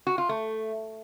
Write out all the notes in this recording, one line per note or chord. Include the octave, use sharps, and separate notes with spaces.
F#4
F4
A3